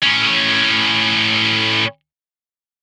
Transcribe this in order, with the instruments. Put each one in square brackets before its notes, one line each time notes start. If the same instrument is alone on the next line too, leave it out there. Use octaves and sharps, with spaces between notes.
[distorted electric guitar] A2 C#4